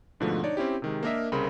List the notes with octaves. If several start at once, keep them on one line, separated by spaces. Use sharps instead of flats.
G#2 B2 D3 F3 A3
D4 D#4 C#5 D5
C4 C#4 E4 G4
C3 D#3 G#3
A#3 D4 A#4 D#5 E5
C2 C#3 C4 A#4 B5 C6